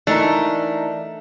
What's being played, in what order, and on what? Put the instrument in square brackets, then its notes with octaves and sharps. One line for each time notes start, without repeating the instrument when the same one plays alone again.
[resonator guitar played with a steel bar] E3 D#4 A#4 [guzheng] A3 [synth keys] D4